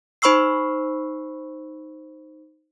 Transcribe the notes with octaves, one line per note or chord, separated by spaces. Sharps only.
D#4 C5 B5 C#6 E6 C7